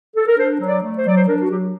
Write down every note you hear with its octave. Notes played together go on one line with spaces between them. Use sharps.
A4
A#4
D4 C5
F#3
D5
A3
C5
F#3 D5
C5
D4 A#4
F#4
F#3 G4